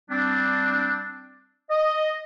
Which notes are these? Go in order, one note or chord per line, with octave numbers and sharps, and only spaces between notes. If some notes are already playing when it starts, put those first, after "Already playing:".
G3 C4 D4
D#5